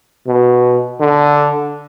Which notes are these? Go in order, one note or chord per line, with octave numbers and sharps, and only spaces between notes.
B2
D3